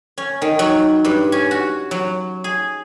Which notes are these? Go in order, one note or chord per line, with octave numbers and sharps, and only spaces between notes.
C#4
D#3
F#3
G2
C#4
F#4
F#3
G#4